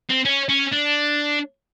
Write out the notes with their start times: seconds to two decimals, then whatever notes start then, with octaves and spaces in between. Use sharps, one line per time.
0.09 C4
0.25 C#4
0.49 C#4
0.72 D4